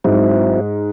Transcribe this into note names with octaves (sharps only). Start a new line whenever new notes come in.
G#2 F#3 C4 E4